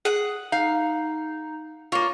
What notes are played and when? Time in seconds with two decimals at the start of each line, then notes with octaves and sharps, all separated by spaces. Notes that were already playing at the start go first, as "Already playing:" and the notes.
0.05 G#4 F#5
0.52 D#4 F5
1.92 A#3 F4 C#5